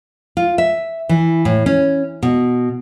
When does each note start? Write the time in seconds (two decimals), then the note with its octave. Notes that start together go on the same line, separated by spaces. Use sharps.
0.37 F4
0.58 E5
1.09 E3
1.45 A2
1.66 C#4
2.23 B2